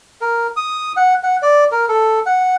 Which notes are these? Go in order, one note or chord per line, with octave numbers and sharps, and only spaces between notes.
A#4
D#6
F#5
F#5
D5
A#4
A4
F#5